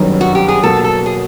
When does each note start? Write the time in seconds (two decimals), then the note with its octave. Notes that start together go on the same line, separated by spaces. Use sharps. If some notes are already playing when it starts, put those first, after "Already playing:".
Already playing: G1 F#2 D#3 G3 B3
0.21 F#4
0.35 G4
0.48 G#4
0.63 B2 F#3 A#3 A4
0.84 A4
1.06 G#4